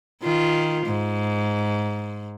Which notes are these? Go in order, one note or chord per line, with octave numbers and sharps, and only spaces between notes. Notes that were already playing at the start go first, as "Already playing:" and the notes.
D#3 F4
G#2